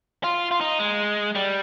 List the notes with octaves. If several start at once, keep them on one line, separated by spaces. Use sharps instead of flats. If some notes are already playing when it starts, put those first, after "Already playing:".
F4
F4
D#4
G#3
G3